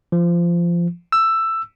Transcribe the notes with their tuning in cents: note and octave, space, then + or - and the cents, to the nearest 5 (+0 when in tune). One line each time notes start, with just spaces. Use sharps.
F3 -20
E6 +10